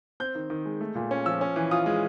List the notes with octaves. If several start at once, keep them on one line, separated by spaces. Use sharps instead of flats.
C4 G6
D#3
D#3
G#3
A3
A#2
C#4
F3 E6
C#4
E3
F4 D#6
G#3